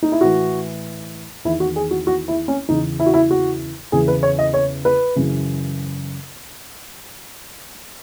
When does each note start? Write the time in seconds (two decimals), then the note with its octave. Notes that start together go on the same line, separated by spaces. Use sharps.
0.03 D#4
0.12 E4
0.21 A2 E3 F#4
1.45 E2 D#3 E4
1.60 F#4
1.76 G#4
1.91 F#4
2.07 F#4
2.28 E4
2.48 C#4
2.69 E2 C#3 E3 D#4
3.00 E4
3.06 F#4
3.14 E4
3.31 F#4
3.92 E2 C#3 E3 G#4
4.08 B4
4.23 C#5
4.39 D#5
4.54 C#5
4.85 B4
5.16 F#2 C#3 E3